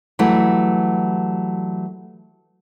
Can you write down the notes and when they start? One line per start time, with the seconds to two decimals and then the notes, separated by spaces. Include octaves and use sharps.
0.19 E3 F#3 G3 A3 E4